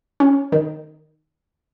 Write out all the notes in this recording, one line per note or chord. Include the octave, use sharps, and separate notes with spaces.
C#4
D#3